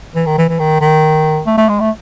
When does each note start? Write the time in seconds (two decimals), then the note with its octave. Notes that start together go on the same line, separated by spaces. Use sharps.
0.15 E3
0.26 D#3
0.38 E3
0.49 E3
0.59 D#3
0.81 D#3
1.47 A3
1.58 A3
1.69 G#3
1.80 A3